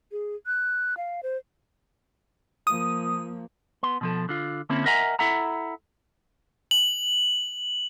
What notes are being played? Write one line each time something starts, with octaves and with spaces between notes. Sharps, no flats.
G#4
F#6
F5
C5
F3 A#3 D#6
B3 C6
B2 F3 A4
D3 F4
D3 A#3 C4 C#4 E4
A#4 D#5 E5 F#5 G#5 A#5
E4 A4 E5 F#5 A#5
F#7